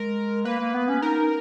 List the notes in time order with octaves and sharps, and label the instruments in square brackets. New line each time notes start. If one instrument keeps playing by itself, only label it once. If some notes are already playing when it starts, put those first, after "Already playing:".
Already playing: [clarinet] G#3 [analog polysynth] A#4
[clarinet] A#3 [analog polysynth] B4
[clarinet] A#3
B3
C#4
[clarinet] D#4 [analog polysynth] A#4